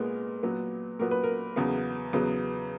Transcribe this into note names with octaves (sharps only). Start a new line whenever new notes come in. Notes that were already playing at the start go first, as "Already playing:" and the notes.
Already playing: A#2 G#3 B3 A#4
A#2 F#3 B3
A#2 F#3 B3 A#4
B4
A#4
E2 C#3 F#3 B3
E2 C#3 F#3 B3